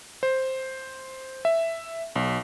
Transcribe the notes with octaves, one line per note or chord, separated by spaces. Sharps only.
C5
E5
B1